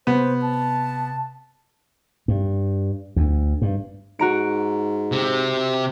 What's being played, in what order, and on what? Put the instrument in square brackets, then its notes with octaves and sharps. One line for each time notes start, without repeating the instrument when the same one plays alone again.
[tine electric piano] C3 [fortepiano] B3 [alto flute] C5
[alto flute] A5
[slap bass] G2
D2
G2
[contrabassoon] G#2 [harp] F#4 A#5 D7
[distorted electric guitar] C3